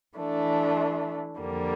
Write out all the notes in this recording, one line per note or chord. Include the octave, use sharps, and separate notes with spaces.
E3 A3 D4
F2 D3 G3 A#3